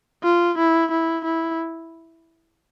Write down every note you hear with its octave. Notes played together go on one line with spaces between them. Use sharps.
F4
E4
E4
E4